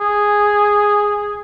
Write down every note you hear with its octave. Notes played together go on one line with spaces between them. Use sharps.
G#4